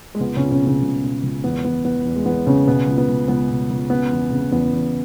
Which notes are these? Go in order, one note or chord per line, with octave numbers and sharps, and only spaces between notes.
G#3
C#2 B3
C#3 C#4
C#2
C#3 C#4
B2
C#3 C#4
C#2
B2
C#2
E2 B3
E2 B3
E2 B3
E2
G#3
E2 B3
C#3 C#4
B2 B3
C#2
B3
C#2
C#2 B3
B2
C#2
C#3 B3
E2
C#3
E2 B3
E2